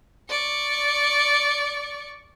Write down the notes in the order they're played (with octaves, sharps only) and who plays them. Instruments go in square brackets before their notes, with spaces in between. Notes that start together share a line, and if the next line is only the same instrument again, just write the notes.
[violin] D5 C#6